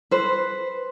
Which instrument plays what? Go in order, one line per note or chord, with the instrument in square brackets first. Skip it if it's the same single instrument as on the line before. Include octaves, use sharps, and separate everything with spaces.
[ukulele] B4 C5